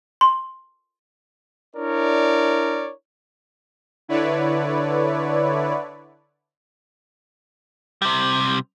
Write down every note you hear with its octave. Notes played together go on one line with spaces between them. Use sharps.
C6
D4 E4 A#4 C#5 D5
D3 E4 B4 C#5 D5
C3 G3